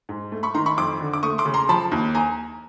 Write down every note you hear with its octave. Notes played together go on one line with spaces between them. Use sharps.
G#2
A3
B5 C#6
D#3 A#5 C6
B5 C#6
F2 C6 D6
D3
D6
A3 C#6 D#6
C6 D6
C#3
A#5 C6
F3 A5 B5
D#2
G#5 A#5